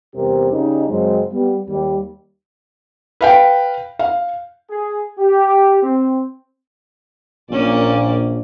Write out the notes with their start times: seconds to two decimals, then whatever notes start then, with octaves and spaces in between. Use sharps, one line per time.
0.14 E2 C3 G3 C4 G4 A#4
0.51 C#3 G3 C#4 D#4
0.88 F#2 C#3 F#3 G#3 C4
1.31 G3 B3
1.68 D#2 G3
3.21 B4 F5 G5
3.99 F5
4.69 G#4
5.17 G4
5.82 C4
7.50 A#1 A#2 A#3 C#4 D5